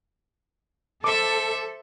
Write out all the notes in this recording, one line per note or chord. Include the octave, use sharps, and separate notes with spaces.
A4 C5 E5 D6